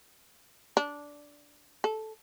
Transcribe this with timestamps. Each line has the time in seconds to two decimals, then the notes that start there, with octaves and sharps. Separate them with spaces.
0.77 D4
1.84 A4